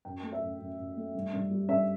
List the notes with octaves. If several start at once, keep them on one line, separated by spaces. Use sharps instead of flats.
F#2 G5
A3
E5
F#2
F#2
F#2
A3
G2
G2
G3
G2 E5